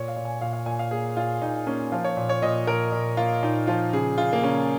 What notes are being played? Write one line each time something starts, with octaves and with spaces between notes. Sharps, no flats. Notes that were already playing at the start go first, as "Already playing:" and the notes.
Already playing: A#2 C#5
F5
A#2
G#5
A#2 F5
F5
A#2 G#5
F5
A#3 G#4
A#2 F4
A#2 D#4
A#3 C#4
F3 F4
C#5
A#2
C#5
A#2 D#5
A#2 A#4
A#2
A#3 F4
A#2 D#4
F3 F4
C#3 G#4
C#3 F4
A#3
C#3 C#4